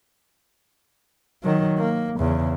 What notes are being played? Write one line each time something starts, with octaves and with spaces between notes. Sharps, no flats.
D#3 F#3
A#3
E2 C#3